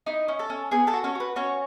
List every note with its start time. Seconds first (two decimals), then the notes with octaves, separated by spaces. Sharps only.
0.06 D#4 E4 D#5
0.28 C#4
0.39 A4 A5
0.50 C#4
0.71 B3 G#4 G#5
0.87 A4 A5
0.93 F#4
1.04 C#4 C#5
1.15 F#4 B4
1.36 C#4 F#4 C#5